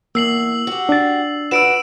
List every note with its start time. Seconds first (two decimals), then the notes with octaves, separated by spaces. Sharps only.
0.15 E2 A#3 E6 C7 F#7
0.67 F#4 G4
0.89 D4 A6
1.51 F#4 B4 D5 E6 D7 E7